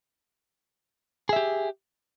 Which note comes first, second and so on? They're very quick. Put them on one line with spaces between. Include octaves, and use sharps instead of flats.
G#4 E5 G4